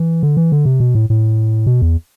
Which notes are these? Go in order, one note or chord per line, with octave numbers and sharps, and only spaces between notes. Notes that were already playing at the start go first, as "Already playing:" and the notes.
Already playing: E3
D3
E3
D3
C3
B2
A2
A2
B2
E2